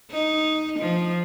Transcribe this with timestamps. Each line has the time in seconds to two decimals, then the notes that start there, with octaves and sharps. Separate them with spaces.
0.11 D#4
0.80 F3